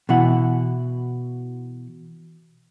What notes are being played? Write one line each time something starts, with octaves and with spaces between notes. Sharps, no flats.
B2 E3 E4 F#5